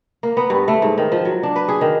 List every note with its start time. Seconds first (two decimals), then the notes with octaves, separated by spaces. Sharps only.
0.23 A#3
0.37 B3
0.50 G2
0.68 A3
0.82 G#2
0.98 D#3
1.12 F3
1.25 F#3
1.43 D4
1.56 B4
1.68 G#4
1.81 D#3